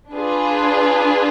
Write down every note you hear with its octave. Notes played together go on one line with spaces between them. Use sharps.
D4 F4 G#4 B4